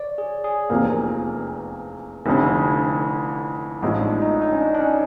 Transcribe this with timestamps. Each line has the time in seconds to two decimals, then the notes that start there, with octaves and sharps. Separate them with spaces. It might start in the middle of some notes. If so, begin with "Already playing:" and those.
Already playing: C#5 D5
0.18 G#4
0.44 G#4
0.69 F1 E2 C3 F3 A#3
2.26 F1 F2 D3 E4
3.82 A1 A2 F3 G#3 D#4
4.02 D4
4.22 D#4
4.42 D#4
4.52 C#4
4.61 D4
4.74 D4
4.80 C#4